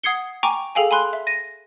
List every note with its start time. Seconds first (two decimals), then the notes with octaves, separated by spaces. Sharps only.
0.03 F#5 D#6 G#6 C7 C#7 G7
0.43 G5 G#5 A#5 C#6 D6
0.75 G#4 A4 F5 G5 G#5
0.91 G#5 B5 C6 F#6
1.13 E5
1.27 A#6 D#7